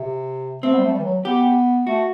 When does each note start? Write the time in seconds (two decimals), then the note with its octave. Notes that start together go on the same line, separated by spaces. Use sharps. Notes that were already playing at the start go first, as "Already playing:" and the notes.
Already playing: C3
0.63 A3 C4
0.73 B3
0.78 G3
0.84 A3
0.93 G3
0.99 E3
1.04 F#3
1.25 B3 G4
1.87 A3 F#4